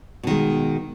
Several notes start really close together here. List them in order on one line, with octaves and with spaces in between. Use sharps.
B2 D#3 G#3